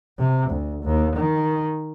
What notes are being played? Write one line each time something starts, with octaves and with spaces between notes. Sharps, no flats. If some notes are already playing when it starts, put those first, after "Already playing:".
C3
D2
D#2
D#3